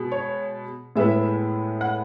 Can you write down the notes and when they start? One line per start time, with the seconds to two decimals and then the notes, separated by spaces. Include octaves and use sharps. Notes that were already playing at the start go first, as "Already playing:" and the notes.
Already playing: B2 G#3
0.12 C#5
0.96 A2 G#3 B3 E4 E5
1.81 F#5